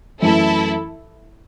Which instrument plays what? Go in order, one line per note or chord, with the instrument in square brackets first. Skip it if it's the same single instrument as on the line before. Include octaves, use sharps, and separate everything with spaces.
[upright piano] F#2 E3 A3 [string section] E4 A4